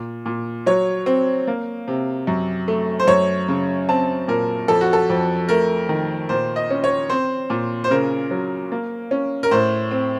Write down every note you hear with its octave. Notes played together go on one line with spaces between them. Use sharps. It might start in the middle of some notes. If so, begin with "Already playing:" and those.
Already playing: A#2
A#2
F#3 C#5
C4
A#3
C3
F#2
A3
C5
F#2 C#5
C#3
C4 A5
A#2 A#4
F2 A4
F#4
A4
F2
A3 A#4
D#3
A#2 C5
D#5
C#4
C#5
C4 C5
A#2
C5
C#3 A#4
F#3
A#3
C#4
A#4
A2 C5
C4